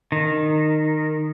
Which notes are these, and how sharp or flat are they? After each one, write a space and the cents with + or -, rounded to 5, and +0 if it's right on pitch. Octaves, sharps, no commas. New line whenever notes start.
D#3 -15